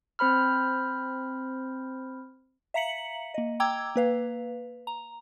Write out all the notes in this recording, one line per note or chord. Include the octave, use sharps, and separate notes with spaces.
C4 C5 B5 F6
E5 F5 A#5 B6 C#7 F#7
A#3 D#5
G5 A#5 D6 E6 G#6
A#3 B4 F5
A#5